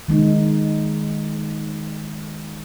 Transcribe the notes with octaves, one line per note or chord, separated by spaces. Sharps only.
D#3 G#3 D#4